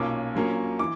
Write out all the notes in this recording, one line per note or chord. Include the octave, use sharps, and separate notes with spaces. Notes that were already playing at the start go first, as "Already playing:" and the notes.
Already playing: B1 A#2 A#3 C#4 D6
A#1 A#2 F#3 A#3 C#4
E3 D6